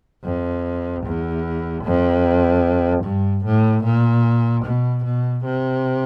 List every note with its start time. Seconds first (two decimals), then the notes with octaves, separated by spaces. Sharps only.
0.24 F2
1.05 E2
1.84 F2
3.04 G2
3.45 A2
3.84 A#2
4.65 B2
5.05 B2
5.45 C3